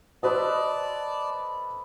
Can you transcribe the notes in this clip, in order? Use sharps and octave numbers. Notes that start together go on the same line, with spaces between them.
A4 B4 C5 D5 D#5 A5